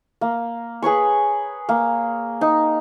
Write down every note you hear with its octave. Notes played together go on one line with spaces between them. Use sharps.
A#3
G#4 B4 C#5 C#6
A#3
D#4